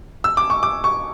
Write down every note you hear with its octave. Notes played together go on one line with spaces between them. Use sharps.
E6
D6
C#6
D6
C#6